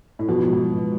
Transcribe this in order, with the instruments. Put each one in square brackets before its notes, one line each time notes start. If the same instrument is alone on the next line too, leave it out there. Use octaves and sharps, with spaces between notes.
[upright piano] A2
[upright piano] B2 [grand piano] F3
[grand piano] G#2
G#2